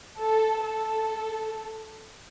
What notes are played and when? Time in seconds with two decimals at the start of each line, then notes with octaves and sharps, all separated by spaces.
0.19 A4
0.65 A4